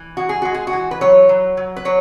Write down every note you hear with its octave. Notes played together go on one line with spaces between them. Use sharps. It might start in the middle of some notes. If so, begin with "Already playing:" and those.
Already playing: E3
G#3 F#4
G#4
G#3 F#4
G#4
F#4
E3
B4
F#3 C#5
F#3
F#3
B4
F#3 C#5